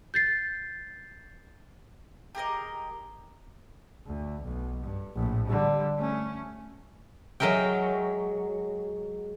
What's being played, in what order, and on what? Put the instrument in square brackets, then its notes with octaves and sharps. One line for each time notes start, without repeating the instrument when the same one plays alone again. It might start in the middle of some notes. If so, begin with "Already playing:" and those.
[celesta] G6 A6 C7
[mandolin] G4 G#4 A#4 D#5
[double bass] D2
B1
G2
A#1 A2
D3 G3
A3 C#4
[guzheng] F#3 G#3 A#4 E5 G5